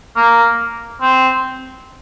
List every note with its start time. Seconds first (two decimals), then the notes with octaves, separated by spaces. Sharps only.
0.16 A#3
1.02 C4